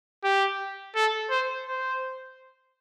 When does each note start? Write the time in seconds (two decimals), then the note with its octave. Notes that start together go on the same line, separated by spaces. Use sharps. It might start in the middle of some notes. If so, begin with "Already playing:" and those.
0.24 G4
0.95 A4
1.30 C5
1.66 C5